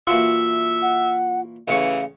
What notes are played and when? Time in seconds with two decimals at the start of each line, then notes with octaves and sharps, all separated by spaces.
0.07 A#2 E3 F4 F#4 E5
0.82 F#5
1.68 A1 C#3 E3 F5 C#6